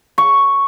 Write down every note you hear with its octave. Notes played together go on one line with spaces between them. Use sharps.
C#6